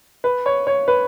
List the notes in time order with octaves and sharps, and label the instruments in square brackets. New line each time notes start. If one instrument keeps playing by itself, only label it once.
[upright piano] B4
C#5
C#5
B4